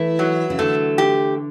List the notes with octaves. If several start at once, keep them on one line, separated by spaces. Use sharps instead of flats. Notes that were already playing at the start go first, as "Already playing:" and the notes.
Already playing: E3 A3 E4
F#3
C#3
D3 A3
G4